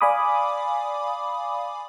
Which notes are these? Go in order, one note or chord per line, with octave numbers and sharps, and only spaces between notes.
D5 F5 G#5 B5 D6 D#6